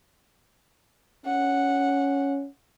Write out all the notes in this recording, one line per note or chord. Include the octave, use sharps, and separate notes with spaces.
C#4 F#5